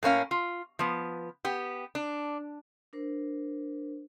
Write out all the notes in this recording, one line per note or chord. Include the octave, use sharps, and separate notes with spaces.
A2 A#3 C#4 F5
F4
F3 B3
B3 G4
D4
D4 A#4 C5